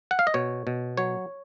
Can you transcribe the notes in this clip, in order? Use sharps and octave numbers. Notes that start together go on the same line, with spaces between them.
F#5
F5
D#5
B2 C#5
B2
F#3 C#5